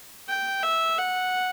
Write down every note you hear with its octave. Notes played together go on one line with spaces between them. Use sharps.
G5
E5
F#5